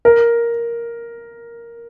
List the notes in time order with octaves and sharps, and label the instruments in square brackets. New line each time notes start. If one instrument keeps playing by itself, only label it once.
[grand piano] A#4